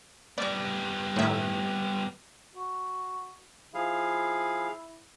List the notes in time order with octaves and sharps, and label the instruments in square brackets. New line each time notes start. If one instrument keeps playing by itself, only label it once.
[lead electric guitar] G3 B3 [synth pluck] D5 D6
[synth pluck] A2 D#3 E5
[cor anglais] F#4
[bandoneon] F3 G#4 F5 [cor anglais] E4